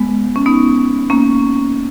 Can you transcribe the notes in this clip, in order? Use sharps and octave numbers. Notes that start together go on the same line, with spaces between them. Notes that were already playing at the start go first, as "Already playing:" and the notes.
Already playing: G#3 B3
C#4
B3 D#4
A#3 C#4